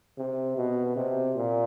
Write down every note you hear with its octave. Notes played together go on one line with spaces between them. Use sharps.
C3
B2
C3
A#2